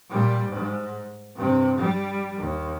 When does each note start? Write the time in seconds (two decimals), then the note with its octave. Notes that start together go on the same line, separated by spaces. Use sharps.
0.10 A#2 G3
0.45 G#2
1.36 G2 C3
1.78 G3
2.37 D#2